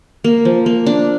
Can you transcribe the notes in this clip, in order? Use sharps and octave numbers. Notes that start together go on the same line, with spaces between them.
A#3
F3
A#3
D4